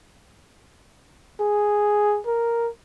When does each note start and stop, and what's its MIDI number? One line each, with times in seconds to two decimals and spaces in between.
1.40 2.20 68
2.26 2.69 70